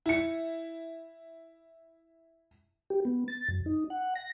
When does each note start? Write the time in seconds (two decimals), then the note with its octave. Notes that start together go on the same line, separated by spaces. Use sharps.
0.06 E4 C#7
2.90 G4
3.05 B3
3.28 A6
3.48 F#2
3.66 D#4
3.90 F#5
4.15 A#6